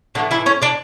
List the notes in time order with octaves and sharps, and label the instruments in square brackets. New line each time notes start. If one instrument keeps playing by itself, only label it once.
[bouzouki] A2 D3 E3 A3 D4
E3 E4
C#4 C#5
D4 D5